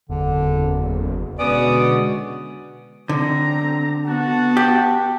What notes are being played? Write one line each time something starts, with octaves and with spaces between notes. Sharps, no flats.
F#1 E2 D3
B2 D3 G#3 B3 C#4 F#4 D5 D#6
D3 C4 A#5
B3 F#4 F#5 A5
G4